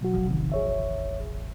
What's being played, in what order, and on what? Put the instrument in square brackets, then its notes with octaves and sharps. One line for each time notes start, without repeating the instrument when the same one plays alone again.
[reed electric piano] B2 F#3 F#4
[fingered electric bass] E1 A1 F3
[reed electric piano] C3 D#3
G#4 C#5 E5